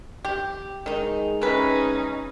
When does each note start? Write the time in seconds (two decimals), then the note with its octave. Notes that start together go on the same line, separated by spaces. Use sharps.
0.25 G4
0.86 D#3 G#3 D#4
1.42 C3 C#4 D#4 B4